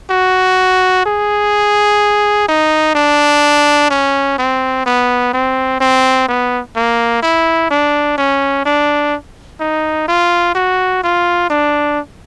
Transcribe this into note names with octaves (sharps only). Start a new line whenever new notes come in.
F#4
G#4
D#4
D4
C#4
C4
B3
C4
C4
B3
A#3
E4
D4
C#4
D4
D#4
F4
F#4
F4
D4